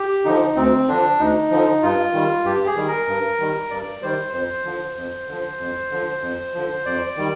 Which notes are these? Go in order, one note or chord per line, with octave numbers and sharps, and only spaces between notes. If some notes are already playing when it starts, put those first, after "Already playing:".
Already playing: G4
D3 F3 D#4
D2 C4
D3 F3 D4
D2 D#4
D3 F3
G2 F4
D#3 G3
G2 G4
G#4
D#3 G3
A#4
G2
D#3 G3
G2 D5
D#3 G3 C5
F2 C5
D3 F3
F2
D3 F3
F2
D3 F3
F2
D3 F3
F2 D5
D#3 G3